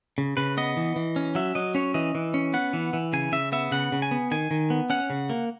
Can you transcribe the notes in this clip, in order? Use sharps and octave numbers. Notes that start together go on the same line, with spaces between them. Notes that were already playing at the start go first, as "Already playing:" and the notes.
C#3
C#3 B4
B3 D#5
E3
E3
C#4
F#3 E5
F#3 D#5
C#4 C#5
E3 D#5
E3
C#4
B3 F#5
E3
E3
C#3 G#5
C#3 E5
B3 E5
C#3 F#5
C#3
G#5
B3
D#3 G#5
D#3
B3
C#4 F#5
C#3
A#3